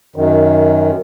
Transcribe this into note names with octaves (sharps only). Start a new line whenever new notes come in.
F#2 D#3